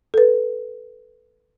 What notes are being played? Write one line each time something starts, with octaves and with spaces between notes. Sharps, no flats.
A4 B4